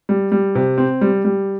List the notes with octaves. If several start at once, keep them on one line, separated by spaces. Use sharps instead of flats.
G3
G3
C3
C4
G3
G3